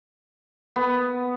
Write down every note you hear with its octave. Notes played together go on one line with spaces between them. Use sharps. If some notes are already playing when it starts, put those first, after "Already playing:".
B3